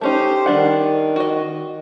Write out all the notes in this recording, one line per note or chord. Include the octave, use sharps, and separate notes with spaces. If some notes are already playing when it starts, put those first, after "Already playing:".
A3 C#4 D#4 G4 C5
D#3 G3 D4 F#5
F#4 D#5